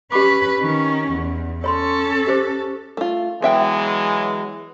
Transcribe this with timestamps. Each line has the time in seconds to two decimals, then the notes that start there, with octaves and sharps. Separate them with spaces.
0.12 C#4 G4 B4 B5 D6
0.60 D#3 C#4
1.12 E2
1.64 C#4 A4 C#5 B5 C6
2.27 G4 C5 D6
2.97 A3 F4
3.42 E3 F#3 G#3 B3 E5 G5